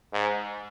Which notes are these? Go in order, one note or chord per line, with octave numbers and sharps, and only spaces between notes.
G#2